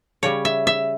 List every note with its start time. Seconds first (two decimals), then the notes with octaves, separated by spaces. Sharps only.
0.23 C#3 G3 C#5
0.45 E5
0.67 E5